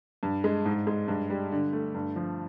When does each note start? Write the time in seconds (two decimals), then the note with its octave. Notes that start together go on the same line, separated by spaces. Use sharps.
0.23 G2
0.44 G#3
0.65 G#2
0.87 G#3
1.08 G2
1.30 G3
1.52 D3
1.73 A3
1.95 G2
2.16 F3